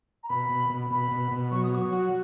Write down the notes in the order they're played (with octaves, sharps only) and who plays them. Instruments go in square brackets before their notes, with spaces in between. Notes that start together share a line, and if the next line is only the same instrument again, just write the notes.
[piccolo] A#5
[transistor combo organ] B2 [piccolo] B5
[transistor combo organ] B2
B2
[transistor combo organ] B2 [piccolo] B5
[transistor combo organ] B2
B2
[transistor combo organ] F#3 [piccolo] C#6
[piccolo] D#6
[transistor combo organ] F#3 [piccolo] C#6
[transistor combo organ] F#4